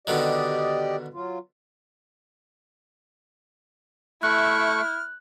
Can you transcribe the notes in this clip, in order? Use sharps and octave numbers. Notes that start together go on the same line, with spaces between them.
B2 D3 D#3 G4 D5 D#5
F#3 F4
A3 E4 C#6 F6 F#6